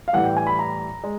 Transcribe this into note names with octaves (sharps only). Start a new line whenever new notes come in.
F5
A2 E3 G3 F#5
G5
G#5
B5
A#5
G#3